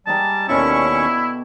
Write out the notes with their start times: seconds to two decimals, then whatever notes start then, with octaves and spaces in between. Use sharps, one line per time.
0.07 G3 G#3 G4 A5 A#5
0.49 D#2 B2 D3 C#4 E4 F#4 C#6